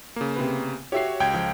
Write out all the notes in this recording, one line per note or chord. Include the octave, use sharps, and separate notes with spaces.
C#3 A#3
C3 B3
F#4 G4 C#5 E5 C7
C#2 G5 G#6
F3